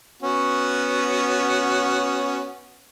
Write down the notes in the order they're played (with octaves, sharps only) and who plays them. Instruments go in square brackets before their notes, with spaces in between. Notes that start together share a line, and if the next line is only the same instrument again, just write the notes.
[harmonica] B3 C#4 F#4